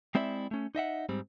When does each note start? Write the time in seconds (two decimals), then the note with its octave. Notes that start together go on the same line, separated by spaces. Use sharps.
0.15 G#3 C4 E4 D5 E5
0.51 A3 C#4
0.75 D#4 D#5 E5 F#5
1.09 G#2 G3 C4